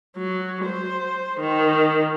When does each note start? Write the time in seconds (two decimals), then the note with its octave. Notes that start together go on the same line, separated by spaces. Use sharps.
0.17 F#3
0.65 C5
1.40 D#3